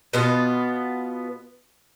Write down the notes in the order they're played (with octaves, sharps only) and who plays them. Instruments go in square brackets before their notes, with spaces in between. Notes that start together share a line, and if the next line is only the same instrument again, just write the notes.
[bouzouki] B2 B3 F4